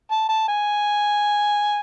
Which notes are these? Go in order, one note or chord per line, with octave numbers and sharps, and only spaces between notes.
A5
A5
G#5